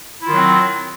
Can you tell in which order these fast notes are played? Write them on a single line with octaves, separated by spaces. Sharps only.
E4 F4 D#3 F#3 C4